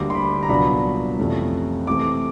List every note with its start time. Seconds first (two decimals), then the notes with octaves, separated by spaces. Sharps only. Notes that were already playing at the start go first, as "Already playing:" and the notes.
Already playing: D2 D3 G3 A#3 D6
0.10 C6
0.15 B5
0.43 A#5
0.49 C2 A#2 F#3 B3 D4 B5
1.18 F2 C3 E3 A3 C#4
1.87 C3 E3 A3 C4 D6